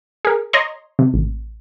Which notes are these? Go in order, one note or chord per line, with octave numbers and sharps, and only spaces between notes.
G#4 A#4
C#5 D#5 A#5 C6
C3
A1